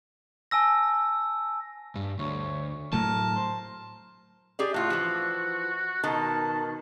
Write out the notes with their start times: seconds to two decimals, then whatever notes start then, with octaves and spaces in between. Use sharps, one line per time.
0.51 G#5 A5 E6 A#6
1.95 G2
2.19 D2 C#5
2.93 A2 F#3 A3 A#4 A5
3.36 C5
4.59 G4 G#4 D5
4.74 A2 F4 F#4
4.90 E3 F3
6.04 B2 D#3 A5